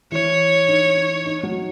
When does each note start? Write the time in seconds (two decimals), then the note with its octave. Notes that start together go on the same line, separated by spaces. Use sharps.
0.12 E3 E4 C#5
0.68 D#4
0.96 D#4
1.26 D#4
1.43 F#3 F#4